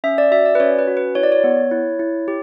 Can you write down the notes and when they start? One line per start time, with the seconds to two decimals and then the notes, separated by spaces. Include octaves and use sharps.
0.04 C#4 E5
0.18 D5
0.31 F#4 E5
0.45 D5
0.55 B4
0.60 C#4 C#5
0.79 B4
0.87 F#4
0.97 B4
1.15 E4 C#5
1.23 D5
1.32 C#5
1.44 B3
1.71 E4
2.00 E4
2.28 G4